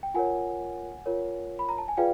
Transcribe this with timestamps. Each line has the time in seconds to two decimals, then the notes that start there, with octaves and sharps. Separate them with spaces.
0.03 G5
0.14 F4 A#4 C#5 F#5 G#5
1.06 F4 A#4 C#5
1.59 B5
1.69 A#5
1.78 A5
1.88 G#5
1.97 F4 G#4 B4 D5 F5 G5